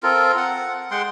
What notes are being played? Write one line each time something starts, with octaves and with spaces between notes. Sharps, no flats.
C4 F4 A4 A#4
F#5
G#3 F#5 G5 C6